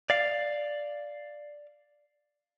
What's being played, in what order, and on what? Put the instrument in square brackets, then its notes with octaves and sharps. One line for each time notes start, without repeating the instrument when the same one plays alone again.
[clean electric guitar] D5 F5